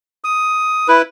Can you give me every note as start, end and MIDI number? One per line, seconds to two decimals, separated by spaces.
0.24 0.88 87
0.88 1.02 64
0.88 1.02 71